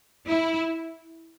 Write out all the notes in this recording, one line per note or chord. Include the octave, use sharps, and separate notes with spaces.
E4